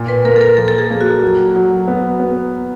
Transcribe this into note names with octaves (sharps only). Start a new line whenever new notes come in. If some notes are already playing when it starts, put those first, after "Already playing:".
Already playing: A#2
B4
A#3 A#4
A4
A#4
F3 A4
A4
G#4
A#3
F#4
F#3
F#3
B3
B3